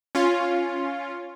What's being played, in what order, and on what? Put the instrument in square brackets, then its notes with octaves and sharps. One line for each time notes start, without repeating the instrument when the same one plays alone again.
[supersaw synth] C#4 F4